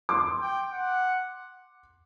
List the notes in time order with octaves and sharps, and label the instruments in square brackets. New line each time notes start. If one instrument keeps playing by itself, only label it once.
[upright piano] C6 D6
[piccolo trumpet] G5
F#5